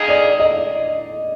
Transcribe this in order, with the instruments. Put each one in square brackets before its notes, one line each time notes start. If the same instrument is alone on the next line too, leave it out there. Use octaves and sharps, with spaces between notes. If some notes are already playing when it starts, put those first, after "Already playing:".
Already playing: [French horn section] F2 D#3 A#3 D#4 G#4 [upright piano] D#5
[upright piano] D5
D#5